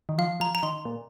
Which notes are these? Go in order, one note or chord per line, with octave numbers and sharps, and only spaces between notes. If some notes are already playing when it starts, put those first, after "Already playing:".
D#3
F3 F5
F3 A#5
A#5
D#3 C6
A#2